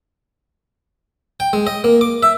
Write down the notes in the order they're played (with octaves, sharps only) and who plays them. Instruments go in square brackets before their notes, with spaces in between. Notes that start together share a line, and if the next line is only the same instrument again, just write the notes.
[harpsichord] G5
G#3
D#5
A#3
D6
E5